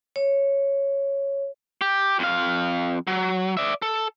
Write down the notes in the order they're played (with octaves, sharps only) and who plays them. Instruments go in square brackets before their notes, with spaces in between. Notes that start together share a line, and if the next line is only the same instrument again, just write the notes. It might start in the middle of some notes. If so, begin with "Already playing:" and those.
[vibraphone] C#5
[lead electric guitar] G4
F2 F5
F#3
D5 E5
A4